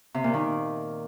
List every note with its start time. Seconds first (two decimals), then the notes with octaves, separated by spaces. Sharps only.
0.14 C3
0.24 A#2
0.34 D#3